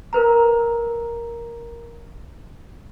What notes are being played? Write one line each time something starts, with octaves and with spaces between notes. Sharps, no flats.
A#4 B4 A#5